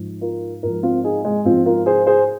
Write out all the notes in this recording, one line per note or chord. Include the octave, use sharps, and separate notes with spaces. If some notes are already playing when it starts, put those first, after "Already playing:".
Already playing: G#2 F3
F4 A#4
G#2 F3 F4 A#4
C4 F4
D#4 G#4
G#3
G#2 F3 C4 F4
F4 A#4
G#4 C5
G#4 C5